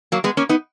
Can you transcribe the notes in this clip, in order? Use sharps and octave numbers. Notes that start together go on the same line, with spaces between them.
F#3 A#3
G#3 B3
A#3 C#4
B3 D#4